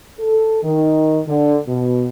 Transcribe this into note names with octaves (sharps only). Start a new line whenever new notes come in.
A4
D#3
D3
B2